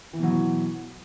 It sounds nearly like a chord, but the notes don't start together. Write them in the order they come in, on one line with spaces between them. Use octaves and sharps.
E3 B2 F#3